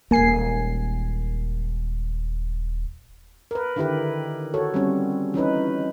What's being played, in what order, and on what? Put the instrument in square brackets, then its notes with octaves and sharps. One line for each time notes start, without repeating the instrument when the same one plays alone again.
[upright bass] D#1 G#3 [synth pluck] A#3 G#5 C7
[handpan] A#4 B4
D3 D#3 E4 G4 B4
F#4 A4 C#5
G3 C4 C#4
E3 C#4 D#4 B4